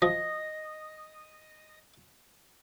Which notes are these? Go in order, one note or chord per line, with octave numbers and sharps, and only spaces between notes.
F3 D#5